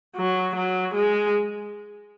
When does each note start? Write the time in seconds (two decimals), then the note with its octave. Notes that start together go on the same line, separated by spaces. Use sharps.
0.16 F#3
0.55 F#3
0.94 G#3